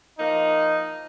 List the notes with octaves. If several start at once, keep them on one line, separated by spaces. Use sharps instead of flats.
F3 A#3 D#4